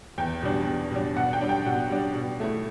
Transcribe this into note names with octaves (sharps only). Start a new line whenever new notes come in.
E2 G5
B2 G3 D4
E2
B2 G3 D4
B2 F#5
G5
G3 D4
G5
B2 F#5
G3 D4
B2
A3 E4